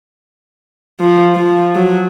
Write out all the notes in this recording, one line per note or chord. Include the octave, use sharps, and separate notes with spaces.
F3
F3
F#3